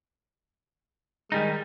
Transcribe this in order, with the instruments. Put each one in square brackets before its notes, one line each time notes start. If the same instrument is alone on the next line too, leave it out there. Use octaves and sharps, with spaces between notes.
[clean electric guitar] D#3 G3 D#4 [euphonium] G#3